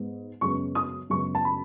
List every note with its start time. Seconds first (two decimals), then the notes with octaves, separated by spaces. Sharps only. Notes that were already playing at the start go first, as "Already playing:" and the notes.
Already playing: G#2 G#3 B3
0.41 F#2 C#3 G#3 B3 C#6
0.75 D#6
1.10 F#2 C#3 G#3 B3 C#6
1.35 A5
1.45 B5